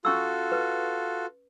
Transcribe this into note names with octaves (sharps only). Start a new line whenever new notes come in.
C#4 F4 F#4 A4 C#6 E6
B4